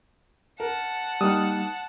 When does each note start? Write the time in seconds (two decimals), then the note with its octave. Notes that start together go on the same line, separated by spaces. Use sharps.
0.60 A#4 F#5 A5
1.21 G3 A#3 D#4 D#6 F6